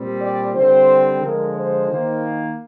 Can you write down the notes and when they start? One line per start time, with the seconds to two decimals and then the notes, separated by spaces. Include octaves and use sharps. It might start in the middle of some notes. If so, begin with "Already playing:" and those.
Already playing: A#2 G3 C4
0.21 D5
0.55 D3 G3 C4 C5
1.22 D3 F3 G#3 A#4
1.56 C5
1.89 D#3 A#3